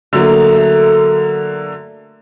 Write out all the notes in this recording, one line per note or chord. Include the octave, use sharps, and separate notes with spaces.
D3 F#3 A3 A#3
A3